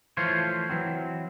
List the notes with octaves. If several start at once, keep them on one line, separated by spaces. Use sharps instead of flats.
E3 F3 A3 F4 C5 C#5
E3 F#3 C4